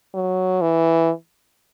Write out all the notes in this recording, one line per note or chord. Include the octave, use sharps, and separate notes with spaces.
F#3
E3